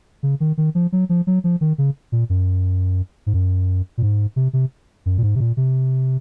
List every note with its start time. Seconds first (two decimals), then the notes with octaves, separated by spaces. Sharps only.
0.23 C#3
0.40 D#3
0.58 D#3
0.75 F3
0.92 F#3
1.09 F3
1.27 F#3
1.44 F3
1.61 D#3
1.78 C#3
2.12 A#2
2.30 F#2
3.26 G#2
3.34 F#2
3.98 A#2
4.02 G#2
4.36 C3
4.53 C3
5.06 F#2
5.18 A#2
5.23 G#2
5.35 C3
5.40 A#2
5.57 C3